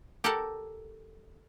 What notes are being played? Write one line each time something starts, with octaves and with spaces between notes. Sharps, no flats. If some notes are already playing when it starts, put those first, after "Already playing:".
G4 A4 A#4 D5 F#5 A5